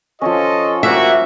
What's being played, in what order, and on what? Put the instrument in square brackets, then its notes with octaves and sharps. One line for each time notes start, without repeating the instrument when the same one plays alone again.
[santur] F3 C#4 [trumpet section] F4 A4 D#5
[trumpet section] G3 A#3 F#4 [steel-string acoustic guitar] E5